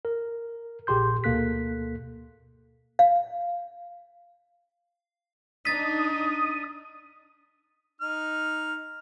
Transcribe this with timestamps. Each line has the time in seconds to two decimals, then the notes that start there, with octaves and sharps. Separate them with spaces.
0.05 A#4
0.87 A#1 A#2 G4 G#4 C6 G6
1.24 D2 B2 A#3 A4 F#6 B6
2.99 F5
5.65 D4 D#4 D#6 A6 B6
8.01 D#4 F6